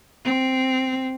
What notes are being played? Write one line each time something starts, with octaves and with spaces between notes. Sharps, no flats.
C4